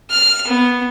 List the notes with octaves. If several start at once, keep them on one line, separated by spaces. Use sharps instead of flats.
F6
B3